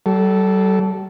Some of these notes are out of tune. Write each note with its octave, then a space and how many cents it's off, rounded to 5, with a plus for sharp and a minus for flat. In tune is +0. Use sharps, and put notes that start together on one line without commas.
G3 -45 A4 -10